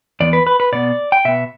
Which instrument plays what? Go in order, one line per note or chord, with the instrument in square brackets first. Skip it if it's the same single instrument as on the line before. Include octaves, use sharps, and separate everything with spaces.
[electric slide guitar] E2 E3 B3 D5
B4
B4
B4
B2 B3 D5
G5
B2 B3 E5